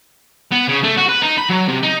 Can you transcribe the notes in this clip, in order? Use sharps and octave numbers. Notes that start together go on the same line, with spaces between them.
B3
C#3
A3
F#4
B4
D#4
B5
F#3
C3
D#4